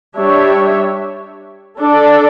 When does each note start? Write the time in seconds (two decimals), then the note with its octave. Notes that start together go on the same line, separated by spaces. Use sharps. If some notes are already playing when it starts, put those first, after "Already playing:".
0.16 G3 D4 G4 C#5 E5
1.81 D4 A4 D5